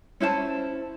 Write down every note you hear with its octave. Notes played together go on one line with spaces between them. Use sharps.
C#4 E4 C5 A5